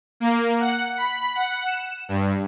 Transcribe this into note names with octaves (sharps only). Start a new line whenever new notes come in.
A#3
F#5
B5
F#5
E7
G2